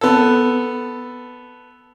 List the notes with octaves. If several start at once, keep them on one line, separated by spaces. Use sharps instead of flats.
B3 A4